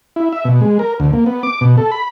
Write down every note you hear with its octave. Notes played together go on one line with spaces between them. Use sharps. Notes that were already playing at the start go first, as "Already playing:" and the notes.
E4
E5
B2
G#3
A#4
D2
A#3
B3
D6
B2
A4
B5